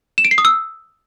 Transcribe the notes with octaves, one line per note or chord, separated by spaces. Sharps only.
E7
D7
C7
D#6
E6